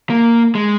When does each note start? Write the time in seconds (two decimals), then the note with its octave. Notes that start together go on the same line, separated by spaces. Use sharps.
0.10 A#3
0.55 G#3